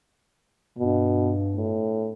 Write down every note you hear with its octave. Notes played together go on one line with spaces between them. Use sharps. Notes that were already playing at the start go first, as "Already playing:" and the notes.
G2 B2
A2